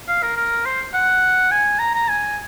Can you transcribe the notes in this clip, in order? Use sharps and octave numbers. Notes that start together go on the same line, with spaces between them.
F5
A#4
A#4
C5
F#5
G#5
A#5
A#5
G#5